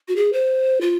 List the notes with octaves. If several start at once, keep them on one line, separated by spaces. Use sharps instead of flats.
F#4
G#4
C5
F4